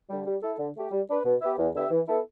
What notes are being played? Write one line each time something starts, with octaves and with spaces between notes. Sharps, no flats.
D3 G3
G3
E4 A4
D3
A3 G4
G3
D4 B4
B2
B3 G4 B4 E5
E2
D3 B3 G4 E5
E3
B3 E4 A4